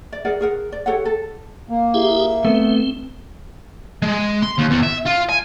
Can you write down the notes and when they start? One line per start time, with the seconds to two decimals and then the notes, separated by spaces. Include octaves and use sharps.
0.12 D5
0.25 G#4 A#4 D5 F#5
0.41 G#4 A#4 F#5
0.72 D5
0.86 G4 A4 C#5 F#5
1.05 A4
1.70 A#3
1.94 E4 G4 G#4 E5
2.45 A3 B3 C4
4.02 G#3
4.43 C6
4.59 D#2
4.71 E2
4.83 E5
5.06 F4
5.29 G#5